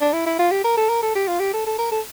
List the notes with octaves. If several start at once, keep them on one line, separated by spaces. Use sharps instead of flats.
D4
E4
E4
F4
G4
A#4
A4
A#4
A4
G4
F4
G4
A4
A4
A#4
A4